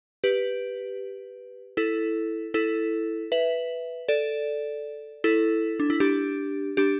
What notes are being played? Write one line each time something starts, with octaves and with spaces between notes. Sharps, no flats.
G4 B4
E4 A4
E4 A4
B4 E5
A4 D5
E4 A4
D4
E4
D4 G4
D4 G4